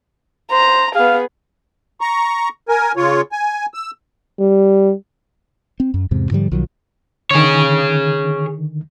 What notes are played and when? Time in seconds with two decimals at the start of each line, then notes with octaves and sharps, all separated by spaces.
0.51 C5 A#5
0.95 B3 G#4 F5
2.01 A#5 C#6
2.69 A#4 G#5
2.97 C#3 F4 C#5
3.32 G#5
3.74 E6
4.40 G3
5.80 C4
5.94 F#2
6.11 E2 G#2 C3
6.31 G#2 D3 F3 G3
6.51 B1 D#3 F3 F#3
7.31 D3 D#3 G#4 C#5